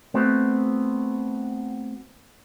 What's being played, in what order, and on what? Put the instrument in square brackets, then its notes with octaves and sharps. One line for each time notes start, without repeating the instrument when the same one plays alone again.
[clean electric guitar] A3 B3 C4 F#4